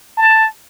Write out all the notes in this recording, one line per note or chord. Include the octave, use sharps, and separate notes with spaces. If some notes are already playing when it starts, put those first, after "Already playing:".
A5